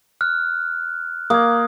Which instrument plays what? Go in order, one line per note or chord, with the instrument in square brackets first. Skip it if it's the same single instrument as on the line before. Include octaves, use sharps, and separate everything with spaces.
[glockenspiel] F6 F#6
[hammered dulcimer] A#3 [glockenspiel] D#6 G#6